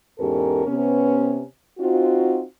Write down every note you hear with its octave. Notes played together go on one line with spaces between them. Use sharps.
E2 G#2 C#4 G4 A4 A#4
C3 B3 C#4
C4 D#4 F4 F#4